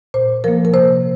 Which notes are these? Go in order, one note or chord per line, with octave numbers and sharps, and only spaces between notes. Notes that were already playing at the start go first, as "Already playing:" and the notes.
A#2 C5
F3 A#3 A#4
A#4
C3 C5